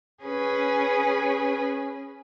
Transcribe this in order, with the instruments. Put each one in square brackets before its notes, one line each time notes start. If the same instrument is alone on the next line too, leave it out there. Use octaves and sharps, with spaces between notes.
[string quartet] C#4 G#4 B4 G#5